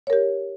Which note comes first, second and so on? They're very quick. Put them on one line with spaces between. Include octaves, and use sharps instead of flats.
C#5 A#4 G4